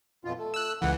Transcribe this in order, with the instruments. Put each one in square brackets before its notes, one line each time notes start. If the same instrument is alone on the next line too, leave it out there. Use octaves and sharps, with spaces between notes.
[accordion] F2 B2 F4
A3
[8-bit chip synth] E6 F#6
[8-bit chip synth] C#2 E3 [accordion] F#5